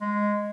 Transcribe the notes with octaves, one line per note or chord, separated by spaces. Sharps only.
G#3